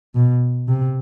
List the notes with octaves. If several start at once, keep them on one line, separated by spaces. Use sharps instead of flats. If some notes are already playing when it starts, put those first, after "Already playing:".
B2
C3